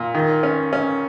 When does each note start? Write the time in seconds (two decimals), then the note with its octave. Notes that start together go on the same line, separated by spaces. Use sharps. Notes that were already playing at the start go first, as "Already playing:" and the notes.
Already playing: A#2
0.15 D#3
0.43 C#4
0.73 C#4